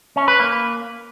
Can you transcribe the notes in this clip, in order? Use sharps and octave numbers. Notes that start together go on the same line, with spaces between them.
C#4
B4
A#3